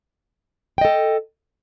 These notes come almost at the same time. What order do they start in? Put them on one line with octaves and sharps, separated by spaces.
G5 D#5 A4